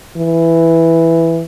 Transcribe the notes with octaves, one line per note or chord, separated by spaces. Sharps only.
E3